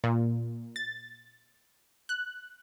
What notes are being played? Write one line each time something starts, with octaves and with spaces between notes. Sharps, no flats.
A#2
A6
F#6